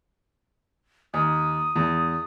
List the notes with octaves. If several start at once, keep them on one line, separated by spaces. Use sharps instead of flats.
D#2 D#6
E2